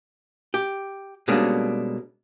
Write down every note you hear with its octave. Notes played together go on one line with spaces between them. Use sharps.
G4
B2 G3 G#3 A#3 C#4 D4